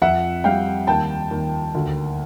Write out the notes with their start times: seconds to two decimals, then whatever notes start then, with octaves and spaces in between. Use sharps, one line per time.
0.02 F2 E5 F#5
0.44 G3 F5 G5
0.87 D#2 G5 A5
1.31 D#2
1.75 D2